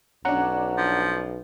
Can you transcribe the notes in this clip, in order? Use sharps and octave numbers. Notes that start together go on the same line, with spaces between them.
B1 C#4 D4 F#5 A#5
F3